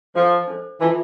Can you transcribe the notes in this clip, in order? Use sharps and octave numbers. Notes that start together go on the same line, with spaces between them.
F3 D4 A4 C5
D4 A4 C5
E3 F4 A4 E5 A5 C6